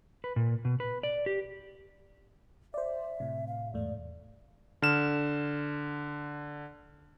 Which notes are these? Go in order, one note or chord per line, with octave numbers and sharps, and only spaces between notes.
B4
A#2
B2
B4
D5
G4
C5 D5 E5
A2 C3
F5
E2 G#2 A3 D5
D3 F6 E7